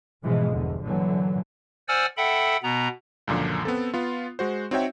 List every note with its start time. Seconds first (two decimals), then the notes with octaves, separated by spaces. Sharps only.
0.23 G#2 B2 E3 F3 G#3
0.53 G1 E2 D3
0.85 A#2 D3 E3 F#3
1.88 C5 D5 F#5 G#5 E6 F6
2.17 A4 E5 F#5 G5 B5
2.63 B2 B3 A#5
3.27 C#2 F#2 A#2 D3 F3
3.65 B3 C4 A4
3.94 B3 F4
4.39 G#3 F#4 C5
4.71 C4 D#4 F#4 C#5 E5 G5